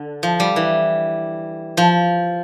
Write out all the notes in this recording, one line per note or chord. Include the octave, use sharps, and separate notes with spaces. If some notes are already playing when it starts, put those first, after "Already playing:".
Already playing: D3
F3
G3
E3
F3